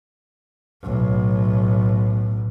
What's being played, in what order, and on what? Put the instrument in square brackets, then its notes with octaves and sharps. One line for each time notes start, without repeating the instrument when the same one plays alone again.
[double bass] B1 A2